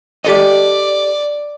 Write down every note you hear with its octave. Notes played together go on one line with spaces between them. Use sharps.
G4 A4 D5 D#5